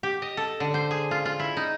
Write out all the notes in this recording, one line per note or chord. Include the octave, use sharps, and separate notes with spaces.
G4
D#5
A4
D3
C5
G#4
F4
F4
E4
D#4